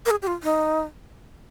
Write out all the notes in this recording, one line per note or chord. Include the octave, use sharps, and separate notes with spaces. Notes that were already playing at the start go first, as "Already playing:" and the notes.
A#4
G#4
G4
F4
D#4